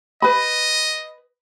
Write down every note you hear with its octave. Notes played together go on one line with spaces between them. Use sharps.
B4 D#5 B5